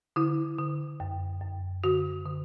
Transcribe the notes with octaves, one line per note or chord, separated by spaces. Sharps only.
D3 E4
D3
F#2
F#2
D3 F#4
D3